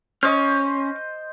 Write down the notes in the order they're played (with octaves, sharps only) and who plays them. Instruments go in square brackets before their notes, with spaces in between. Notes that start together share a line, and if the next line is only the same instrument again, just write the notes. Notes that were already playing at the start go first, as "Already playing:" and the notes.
[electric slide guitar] C#4 [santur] C5 D#5 [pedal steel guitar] C#6 D6 F6